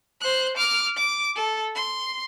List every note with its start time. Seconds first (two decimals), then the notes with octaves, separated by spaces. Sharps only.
0.21 C5 F#6
0.57 D6 F6
0.96 D6
1.36 A4
1.76 C6